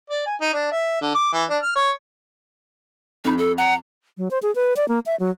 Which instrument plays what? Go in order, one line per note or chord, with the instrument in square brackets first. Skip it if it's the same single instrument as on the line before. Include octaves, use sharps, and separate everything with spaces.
[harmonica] D5
G#5
D#4
D4
E5
D3
D6
E3
D4
F6
C#5
[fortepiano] F2 B5 [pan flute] D#4
[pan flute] A4
[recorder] F#5 [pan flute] A#5
[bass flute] F#3
C5
G#4
B4
D5
A#3
E5
F#3